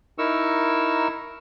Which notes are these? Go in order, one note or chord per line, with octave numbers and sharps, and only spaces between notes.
D#4 E4 A#4 C#6 E6